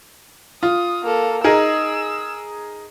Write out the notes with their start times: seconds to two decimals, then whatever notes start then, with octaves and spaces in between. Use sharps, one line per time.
0.63 F4 D#6
1.03 A#3 A4
1.44 D#4 G#4 A#4 E6